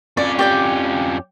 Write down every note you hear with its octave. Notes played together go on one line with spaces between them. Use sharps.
F2 C#4 D5
G4 D5 G5